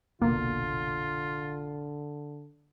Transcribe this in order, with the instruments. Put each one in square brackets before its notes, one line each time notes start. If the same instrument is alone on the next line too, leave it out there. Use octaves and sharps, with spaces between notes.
[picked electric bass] F1 A#1 B2 [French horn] D3 [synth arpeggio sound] A#3 [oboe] F4